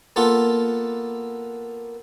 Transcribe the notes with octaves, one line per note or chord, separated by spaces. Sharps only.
A#3 B3 F4 A4